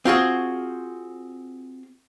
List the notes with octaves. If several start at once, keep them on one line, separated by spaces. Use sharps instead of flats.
C4 F4 F#4 G#4